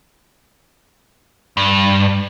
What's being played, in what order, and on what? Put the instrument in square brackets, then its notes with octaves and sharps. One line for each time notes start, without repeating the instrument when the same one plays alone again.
[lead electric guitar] G2